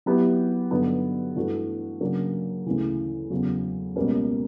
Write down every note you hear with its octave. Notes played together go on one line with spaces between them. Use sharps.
F#3 B3 E4 G4 B4
G2 D3 F#3 B3 D#4
G2 E3 A3 D4 F#4
C#3 F#3 A#3 D4
D2 C#3 E3
E2 C#3 F#3
C#2 B2 G3 A#3 C#4